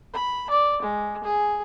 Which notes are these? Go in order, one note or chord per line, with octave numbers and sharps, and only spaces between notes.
B5
D5
G#3
G#4